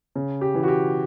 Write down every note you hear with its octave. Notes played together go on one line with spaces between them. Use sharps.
C#3
G4
E3
F#4
G4